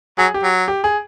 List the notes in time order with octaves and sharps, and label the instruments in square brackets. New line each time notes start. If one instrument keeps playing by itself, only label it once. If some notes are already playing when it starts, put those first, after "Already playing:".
[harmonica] F#3 [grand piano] G#4
[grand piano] G4
[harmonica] F#3
[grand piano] G4
G#4